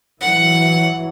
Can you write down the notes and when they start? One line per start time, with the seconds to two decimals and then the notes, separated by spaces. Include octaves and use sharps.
0.21 E3 F#3 F#5